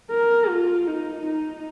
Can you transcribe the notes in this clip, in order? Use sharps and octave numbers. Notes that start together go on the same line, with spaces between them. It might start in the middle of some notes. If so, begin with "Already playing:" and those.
A#4
F4
D#4
D#4